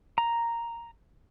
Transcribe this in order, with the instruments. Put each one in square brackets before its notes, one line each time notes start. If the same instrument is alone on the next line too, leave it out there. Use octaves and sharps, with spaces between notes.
[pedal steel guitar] A#5